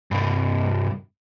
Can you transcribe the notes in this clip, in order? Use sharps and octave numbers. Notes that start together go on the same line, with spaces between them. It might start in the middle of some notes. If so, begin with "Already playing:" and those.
C2 G2